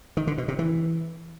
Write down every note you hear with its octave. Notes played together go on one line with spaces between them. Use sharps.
D#3
D3
B2
C3
E3